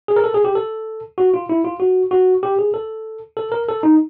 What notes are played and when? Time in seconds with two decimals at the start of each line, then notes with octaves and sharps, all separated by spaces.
0.08 G#4
0.16 A#4
0.24 A4
0.34 G#4
0.45 G4
0.55 A4
1.18 F#4
1.34 F4
1.49 E4
1.65 F4
1.80 F#4
2.11 F#4
2.43 G4
2.59 G#4
2.74 A4
3.37 A4
3.52 A#4
3.68 A4
3.83 D#4